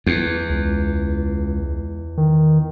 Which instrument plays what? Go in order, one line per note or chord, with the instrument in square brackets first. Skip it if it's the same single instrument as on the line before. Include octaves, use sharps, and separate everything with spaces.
[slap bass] E2
[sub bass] C#2
D#3